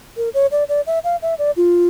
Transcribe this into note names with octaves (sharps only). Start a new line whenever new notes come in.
A#4
C#5
D5
D5
E5
F5
E5
D5
F4